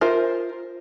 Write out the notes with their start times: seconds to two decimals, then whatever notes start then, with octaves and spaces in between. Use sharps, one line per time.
0.01 F4 A#4 C5 E5